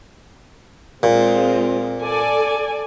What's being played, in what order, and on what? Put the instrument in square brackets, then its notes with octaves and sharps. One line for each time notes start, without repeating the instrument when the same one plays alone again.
[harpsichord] A#2 [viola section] G#3 C4 F4
[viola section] A4 D5 G#5